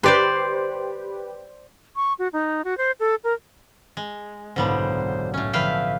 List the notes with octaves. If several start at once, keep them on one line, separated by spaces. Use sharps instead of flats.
G4 B4 C5 D5 C6
C#6
F#4
D#4
F#4
C5
A4
A#4
G#3
F#1 B1 G#2 D3 G3 B3 C5
A2 C#4
D3 F3 B4 E5 F5 G5